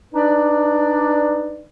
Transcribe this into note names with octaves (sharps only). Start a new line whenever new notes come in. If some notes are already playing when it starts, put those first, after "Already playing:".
D4 D#4 B4 D5